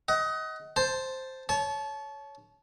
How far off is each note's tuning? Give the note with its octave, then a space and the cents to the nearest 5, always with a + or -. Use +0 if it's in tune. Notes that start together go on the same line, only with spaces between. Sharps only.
D#5 +20 F#5 +30
C5 +0 A5 +0
C#5 +10 A5 -25